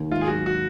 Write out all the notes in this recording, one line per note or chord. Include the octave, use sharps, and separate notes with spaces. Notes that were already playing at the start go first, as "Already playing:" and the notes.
Already playing: D#2
G#2 F4
G#4
F#3 F#4
F#4